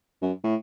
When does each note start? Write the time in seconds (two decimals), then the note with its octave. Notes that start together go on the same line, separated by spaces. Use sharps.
0.22 F#2
0.44 A2